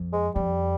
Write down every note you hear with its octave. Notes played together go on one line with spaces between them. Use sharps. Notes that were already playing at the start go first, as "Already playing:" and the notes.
Already playing: F2
G#3
F2 G3